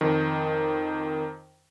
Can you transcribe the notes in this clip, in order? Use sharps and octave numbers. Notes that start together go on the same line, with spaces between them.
F2 D#3